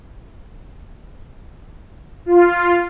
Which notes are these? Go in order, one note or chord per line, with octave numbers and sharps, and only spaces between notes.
F4